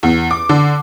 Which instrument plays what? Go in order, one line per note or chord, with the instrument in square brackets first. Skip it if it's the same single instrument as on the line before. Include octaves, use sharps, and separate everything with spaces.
[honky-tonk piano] E2
D6
D3